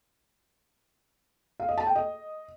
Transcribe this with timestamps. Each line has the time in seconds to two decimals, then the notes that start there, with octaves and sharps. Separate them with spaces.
1.60 F5
1.69 D#5
1.78 A5
1.87 G5
1.96 D#5